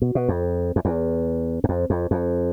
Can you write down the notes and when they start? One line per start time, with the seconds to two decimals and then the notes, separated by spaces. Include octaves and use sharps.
0.02 B2
0.15 B2
0.28 F2
0.76 F2
0.85 E2
1.64 F#2
1.69 F2
1.90 F2
2.11 F2